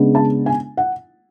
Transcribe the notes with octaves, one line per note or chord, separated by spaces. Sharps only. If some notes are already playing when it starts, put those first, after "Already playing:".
Already playing: C#3 G#3 B3 D4
A5
G#5
F#5